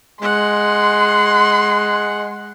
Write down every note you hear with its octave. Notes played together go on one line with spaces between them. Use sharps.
G#3 F#5 C6